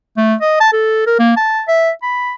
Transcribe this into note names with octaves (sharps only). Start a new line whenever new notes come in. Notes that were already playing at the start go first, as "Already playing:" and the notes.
A3
D#5
A5
A4
A#4
A#3
A5
E5
B5